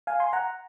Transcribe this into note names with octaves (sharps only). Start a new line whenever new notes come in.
F5 G#5
G#5 C6
F#5 A#5